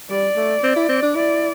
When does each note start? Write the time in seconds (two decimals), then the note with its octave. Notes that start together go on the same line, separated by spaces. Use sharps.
0.10 G3 D5
0.36 A3
0.63 C4
0.76 E4
0.89 C4
1.03 D4
1.15 E4 D5